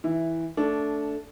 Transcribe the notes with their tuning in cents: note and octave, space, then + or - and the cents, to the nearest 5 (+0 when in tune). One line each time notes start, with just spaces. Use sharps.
E3 -10 E5 +0
A3 +0 D4 -15